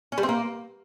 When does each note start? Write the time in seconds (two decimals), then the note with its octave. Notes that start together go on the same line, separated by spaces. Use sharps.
0.12 C#4
0.18 G3
0.23 C4
0.29 A#3